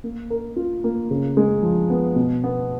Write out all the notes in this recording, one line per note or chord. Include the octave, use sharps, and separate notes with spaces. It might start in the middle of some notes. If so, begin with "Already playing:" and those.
A#3
A#4
F4
A#3
C#3
G#3
F3
B3
B2
B3